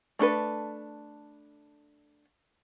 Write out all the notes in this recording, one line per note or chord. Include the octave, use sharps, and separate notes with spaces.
A3 D4 A4 B4